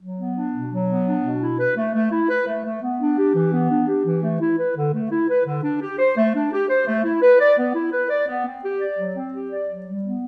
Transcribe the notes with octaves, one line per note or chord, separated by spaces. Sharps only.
F#3
B3
D4
B2
F#3
B3
D4
B2
E4
B4
A3
A3
E4
B4
A3
A3
B3
D4
G4
E3
B3
D4
G4
E3
A3
E4
B4
D3
A3
E4
B4
D3
D4
G4
C5
A3
D4
G4
C5
A3
E4
B4
D5
B3
E4
B4
D5
B3
C4
G4
D5
F#3
C4
G4
D5
F#3
G3
B3